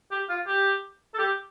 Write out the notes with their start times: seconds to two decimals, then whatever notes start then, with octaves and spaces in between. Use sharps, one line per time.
0.11 G4
0.29 F4
0.47 G4
1.14 A4
1.18 G4